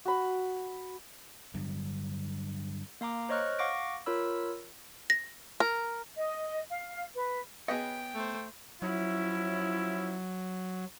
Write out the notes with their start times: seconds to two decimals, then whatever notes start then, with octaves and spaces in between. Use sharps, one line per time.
0.05 F#4 B5
1.54 G2 D3 F#3
3.01 A#3 F5 A#5 D6
3.29 C5 C#5 D#5 C#6 F6 F#6
3.59 F5 F#5 C#6 D6 A#6 D7
4.06 F4 A#4 C#5 B5 E6
5.10 A#6
5.60 A#4
6.16 D#5
6.69 F5
7.14 B4
7.68 B3 G#4 B4 C#5 D#5 G5
8.15 A3 C5
8.82 F3 F#3 C#4 E4